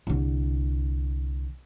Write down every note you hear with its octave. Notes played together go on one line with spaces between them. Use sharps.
C2 D3